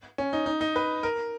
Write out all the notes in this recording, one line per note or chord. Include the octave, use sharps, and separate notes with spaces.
C#4
D#4
D#4
D#4
B4
A#4